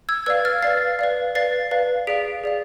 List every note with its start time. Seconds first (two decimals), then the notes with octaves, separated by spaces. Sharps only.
0.09 E6 G#6
0.26 B4 D5 F5 E6 G#6
0.45 F6 A6
0.62 B4 D5 F5 A6 C7
0.99 B4 D5 F5
1.35 B4 D5 F5 A6 C7
1.71 B4 D5 F5
2.07 G#4 D5 F5 B6 D7
2.44 G#4 D5 F5